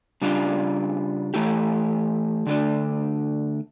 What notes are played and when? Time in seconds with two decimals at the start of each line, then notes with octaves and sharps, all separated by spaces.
0.22 C#3 G3 D4 F4
1.34 E3 A3 E4 G4
2.47 D3 A3 D4